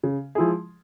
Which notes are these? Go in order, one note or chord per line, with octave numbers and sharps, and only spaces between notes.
C#3
F3 G#3 E4 G#4